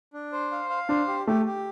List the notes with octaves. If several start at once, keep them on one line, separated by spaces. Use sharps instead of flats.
D4
C5
F5
F5
D4 C5
G4
A3 G4
G4